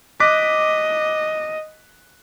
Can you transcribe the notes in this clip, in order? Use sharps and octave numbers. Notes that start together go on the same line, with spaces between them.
D#5 D6 F#6 B6